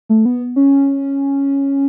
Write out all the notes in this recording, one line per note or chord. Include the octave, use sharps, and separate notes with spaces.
A3
B3
C#4